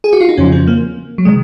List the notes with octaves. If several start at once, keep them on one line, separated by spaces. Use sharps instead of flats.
G#4
F#4
F4
D#4
F2 C#3 F3 C#4
C4
A#3
F#3
C3 D#3 G#3